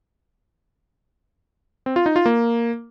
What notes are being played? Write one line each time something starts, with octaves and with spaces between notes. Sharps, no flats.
C4
F4
D#4
F4
A#3